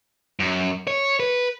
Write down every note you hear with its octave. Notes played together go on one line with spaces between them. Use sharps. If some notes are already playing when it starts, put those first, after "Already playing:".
F#2
C#5
B4